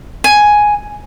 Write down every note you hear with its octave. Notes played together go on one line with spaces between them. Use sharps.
G#5